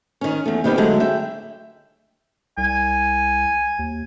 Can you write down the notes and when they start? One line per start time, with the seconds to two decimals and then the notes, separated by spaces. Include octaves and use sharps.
0.21 D#3 C#4
0.46 E2 A3
0.64 C3 D#3 G3 B3 G4
0.78 D3 F#3 G#3 A3
1.00 E5 G5
2.58 C2 G#5
3.79 D#2